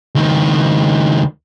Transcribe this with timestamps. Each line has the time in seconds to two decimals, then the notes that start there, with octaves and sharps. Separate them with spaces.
0.15 C#2 D#3